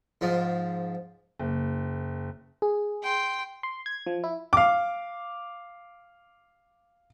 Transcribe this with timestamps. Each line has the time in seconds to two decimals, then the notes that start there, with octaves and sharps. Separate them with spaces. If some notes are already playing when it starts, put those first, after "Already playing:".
0.21 G#2 F3
1.39 F#1
2.62 G#4
3.02 G5 C6
3.63 C6
3.86 G#6
4.07 F3
4.24 E4
4.53 F5 D6